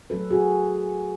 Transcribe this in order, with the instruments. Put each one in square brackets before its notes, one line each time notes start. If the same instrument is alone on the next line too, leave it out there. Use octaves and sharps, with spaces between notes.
[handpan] F#3 A4 B4
A3
F#4 G#4